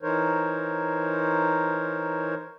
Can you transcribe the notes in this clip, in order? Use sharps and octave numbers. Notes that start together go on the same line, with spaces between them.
E3 D#4 A#4 C5 C#5